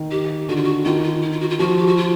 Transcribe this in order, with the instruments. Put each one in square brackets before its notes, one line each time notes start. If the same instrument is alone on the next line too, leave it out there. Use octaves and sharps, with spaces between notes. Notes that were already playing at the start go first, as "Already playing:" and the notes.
Already playing: [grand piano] D#3
[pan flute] G4
[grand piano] D3 [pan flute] F#4
[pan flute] F4
F#4
[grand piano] D#3 [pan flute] F4
[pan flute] F4
E4
F4
F#4
F4
[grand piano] F3 [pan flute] F#4
[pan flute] G4
F#4
F4